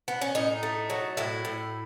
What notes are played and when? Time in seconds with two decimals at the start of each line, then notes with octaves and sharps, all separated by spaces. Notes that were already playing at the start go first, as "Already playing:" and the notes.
0.08 B3
0.22 C#4
0.35 A2 D#4
0.63 A3
0.90 F#3
1.17 A2 E4
1.45 A2